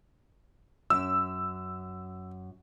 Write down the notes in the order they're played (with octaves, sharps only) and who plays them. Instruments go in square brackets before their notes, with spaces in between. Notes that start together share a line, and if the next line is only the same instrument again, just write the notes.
[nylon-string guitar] F#2 [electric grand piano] E6